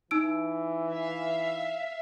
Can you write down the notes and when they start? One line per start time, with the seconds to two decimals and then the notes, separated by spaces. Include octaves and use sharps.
0.11 E3 D#4 E6 D7
0.91 E5 F5